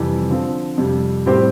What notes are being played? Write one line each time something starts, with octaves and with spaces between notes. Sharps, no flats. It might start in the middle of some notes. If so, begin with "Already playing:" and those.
Already playing: F2 C3 E3 G3
D3 F3 C4
F2 C3 G3
A2 G3 C4 G4 C5